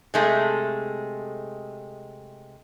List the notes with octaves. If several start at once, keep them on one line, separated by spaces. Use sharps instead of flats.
C3 G#3 A3